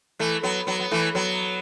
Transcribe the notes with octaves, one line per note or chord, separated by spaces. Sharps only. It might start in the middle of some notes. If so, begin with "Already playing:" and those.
E3 A3
F#3 B3
F#3 B3
B3
E3 A3
F#3 B3